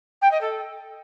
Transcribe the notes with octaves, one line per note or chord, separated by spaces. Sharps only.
G5
D#5
A4